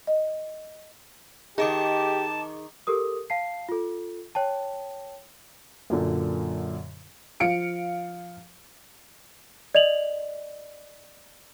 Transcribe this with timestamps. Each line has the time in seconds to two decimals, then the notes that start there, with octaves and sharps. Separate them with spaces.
0.07 D#5
1.58 D#3 D#4 G4 G#4 D#5 A5 D6
2.87 G4 A4 A#4 D#6
3.30 F5 A5 C7
3.69 F4 A4
4.35 C#5 G5 A5
5.90 F#2 A#2 D3
7.40 F3 F5 C#7 D7
9.75 D5 D#5 F7 F#7